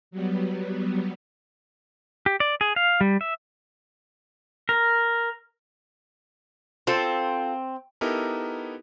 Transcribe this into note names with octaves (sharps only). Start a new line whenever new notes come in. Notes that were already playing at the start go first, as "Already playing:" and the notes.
F#3 G3 B3
G4
D5
G#4
F5
G3
E5
A#4
C4 F4 A4
B3 D#4 E4 G4 A4 A#4